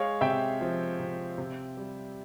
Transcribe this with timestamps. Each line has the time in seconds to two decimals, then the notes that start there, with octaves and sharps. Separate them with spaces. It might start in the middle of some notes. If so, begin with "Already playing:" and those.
Already playing: G#3 C#5 F5
0.21 C3 E5 G5
0.61 F3
1.00 C3
1.38 C3
1.77 G3